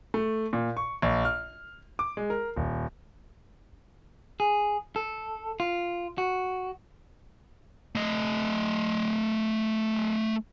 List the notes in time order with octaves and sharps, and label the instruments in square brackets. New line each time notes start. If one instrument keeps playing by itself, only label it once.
[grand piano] A3
A#2
C#6
A#1
F6
D6
G#3
A#4
D#1
[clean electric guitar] G#4
A4
F4
F#4
[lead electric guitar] A3 D#5